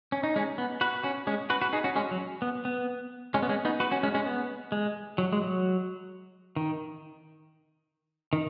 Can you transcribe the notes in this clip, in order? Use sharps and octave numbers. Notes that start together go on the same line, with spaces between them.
C#4
D#4
G#3 C#4
B3
F#4 B4
C#4 F#4
G#3 C#4
F#4 B4
F#4 B4
D#4 G#4
C#4 F#4
G#3 C#4
F#3
B3
B3
G#3 C#4
B3
G#3 C#4
B3 D#4
F#4 B4
C#4 F#4
G#3 C#4
G#3 C#4
B3
G#3
F#3
G#3
F#3
D#3
D#3